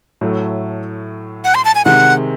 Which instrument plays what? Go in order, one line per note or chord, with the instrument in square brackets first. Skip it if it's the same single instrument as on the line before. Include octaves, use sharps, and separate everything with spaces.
[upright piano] A2 F#3 A3
[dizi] F#5
C6
A5
G#5
[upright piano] C3 D#3 G#3 [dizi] F#5